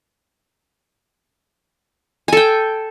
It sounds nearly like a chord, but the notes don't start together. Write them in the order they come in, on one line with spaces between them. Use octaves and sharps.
G#5 A4 G5